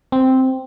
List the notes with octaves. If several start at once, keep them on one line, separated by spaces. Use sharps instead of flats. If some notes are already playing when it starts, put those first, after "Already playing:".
C4